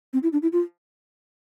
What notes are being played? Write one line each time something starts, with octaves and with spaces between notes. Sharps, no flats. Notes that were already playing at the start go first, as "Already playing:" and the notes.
C4
E4
D4
E4
F4